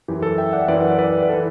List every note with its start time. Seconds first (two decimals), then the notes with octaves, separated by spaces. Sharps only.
0.08 F#2 E3 G4
0.23 A4
0.38 E5 G5
0.53 D5 F#5
0.68 F#2 E3 B4 D5
0.98 B4 D5
1.23 B4
1.29 E3 A4